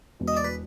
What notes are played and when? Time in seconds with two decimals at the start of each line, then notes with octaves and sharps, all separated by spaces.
0.20 E1 E2 B2
0.28 D#5
0.37 D5
0.44 B4